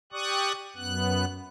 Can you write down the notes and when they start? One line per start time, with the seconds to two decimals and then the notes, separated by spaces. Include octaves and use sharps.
0.12 G4 D5 C#6 D#6 F#6
0.76 F#2 B3 F#6